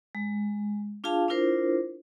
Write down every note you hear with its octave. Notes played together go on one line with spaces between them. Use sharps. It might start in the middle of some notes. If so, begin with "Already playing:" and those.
G#3
D4 F4 G#4 F5 A5
D4 E4 F4 A#4 C5